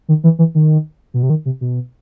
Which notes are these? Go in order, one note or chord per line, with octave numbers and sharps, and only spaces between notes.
D#3
E3
E3
D#3
B2
C3
D#3
C3
B2